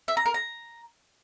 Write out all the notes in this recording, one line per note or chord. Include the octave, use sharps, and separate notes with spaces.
E5
A#5
A#4
A#5